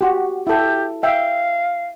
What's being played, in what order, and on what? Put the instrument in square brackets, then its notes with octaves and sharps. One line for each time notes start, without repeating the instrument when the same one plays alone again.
[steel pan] F#4 G4
[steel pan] E4 A4 [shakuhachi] G4
[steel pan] E5 G5 [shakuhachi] F5